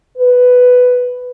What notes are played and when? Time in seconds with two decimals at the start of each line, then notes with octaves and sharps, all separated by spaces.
0.18 B4